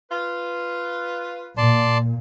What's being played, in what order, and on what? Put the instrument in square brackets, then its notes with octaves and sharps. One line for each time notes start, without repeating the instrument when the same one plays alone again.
[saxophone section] F4 B4
[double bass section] A#2 [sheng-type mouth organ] D5 A5 C6